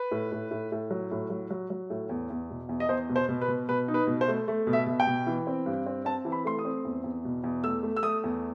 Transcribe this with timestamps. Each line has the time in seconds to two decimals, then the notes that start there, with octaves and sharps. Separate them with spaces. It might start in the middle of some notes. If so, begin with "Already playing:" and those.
Already playing: B4
0.11 A2
0.32 A2
0.51 A2
0.72 A2
0.91 F#3
1.12 A2
1.30 F#3
1.50 F#3
1.70 F#3
1.90 A2
2.09 E2
2.30 E2
2.50 B2
2.69 E2
2.80 D#5
2.89 E2 C5
3.09 B2
3.16 C5
3.28 B2
3.41 B4
3.48 B2
3.69 B2 B4
3.88 D#4
3.94 B4
4.07 B2
4.21 C5
4.28 A3
4.48 A3
4.67 B2
4.73 E5
4.87 B2
5.00 G5
5.07 B2
5.27 E3
5.47 C4
5.66 G2
5.86 C4
6.05 C4 A5
6.25 E3
6.32 B5
6.45 A3 C6
6.59 D#6
6.65 C4
6.85 E2
7.04 E2
7.25 B2
7.44 E2
7.63 A3 E6
7.83 A3
7.96 E6
8.03 A3 D#6
8.24 E2